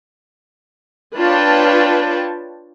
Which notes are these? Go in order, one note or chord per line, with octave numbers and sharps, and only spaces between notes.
D4 F4 B4 C#5 G5 A5